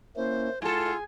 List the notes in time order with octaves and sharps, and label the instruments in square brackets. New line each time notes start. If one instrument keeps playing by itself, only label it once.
[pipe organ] A#3 C#4 E4 [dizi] C5
[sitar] G#2 A4 [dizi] F4 [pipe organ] G#4 G#5